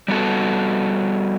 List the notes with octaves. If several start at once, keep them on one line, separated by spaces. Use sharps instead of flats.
G3 B3 F#4 A4